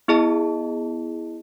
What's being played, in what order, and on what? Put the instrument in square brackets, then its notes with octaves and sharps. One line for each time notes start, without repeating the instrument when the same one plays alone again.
[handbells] B3 E4 G#4 D#5 A5